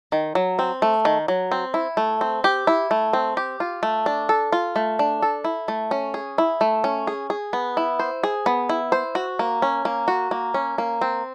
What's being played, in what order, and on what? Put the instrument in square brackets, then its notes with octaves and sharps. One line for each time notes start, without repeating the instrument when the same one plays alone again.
[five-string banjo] D#3
F#3
C4
A3
D#3
F#3
C4
E4
A3
C4
G4
E4
A3
C4
G4
F4
A3
D4
A4
F4
A3
D4
A4
E4
A3
C#4
G#4
E4
A3
C#4
G#4
G#4
B3
E4
C5
G#4
B3
E4
C5
F#4
A#3
C#4
A#3
F#4
A#3
C#4
A#3
C4